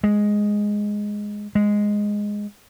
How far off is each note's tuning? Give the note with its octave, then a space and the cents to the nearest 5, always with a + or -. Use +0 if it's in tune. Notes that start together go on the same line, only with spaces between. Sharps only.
G#3 +0
G#3 -5